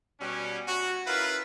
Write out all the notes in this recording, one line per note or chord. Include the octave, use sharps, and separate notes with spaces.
B2 G3 C#4
F#4
C#4 E4 F4 A#4 B4